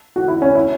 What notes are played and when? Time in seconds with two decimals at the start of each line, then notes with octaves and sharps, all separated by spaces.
0.16 F#4
0.28 E4
0.42 C#4
0.55 E4